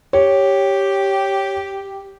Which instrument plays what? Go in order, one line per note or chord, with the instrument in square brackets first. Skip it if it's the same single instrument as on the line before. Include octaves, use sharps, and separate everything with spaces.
[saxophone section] G4 [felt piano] C#5